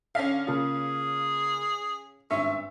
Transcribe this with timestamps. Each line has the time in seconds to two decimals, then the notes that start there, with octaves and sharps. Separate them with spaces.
0.15 D3 C#4 F5 B6 C7
0.47 C#3 A#3 F4 G#4
2.31 G#1 G2 C#4 E5